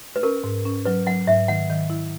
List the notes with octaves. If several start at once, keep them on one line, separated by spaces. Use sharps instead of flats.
B4
C#4 A#4
G#2
C#4
F#3 B4
F#3 F#5
G#2 E5
D#3 F#5
D#3
E4